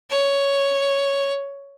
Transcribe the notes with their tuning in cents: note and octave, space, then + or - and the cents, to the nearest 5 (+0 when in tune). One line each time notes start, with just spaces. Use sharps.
C#5 +5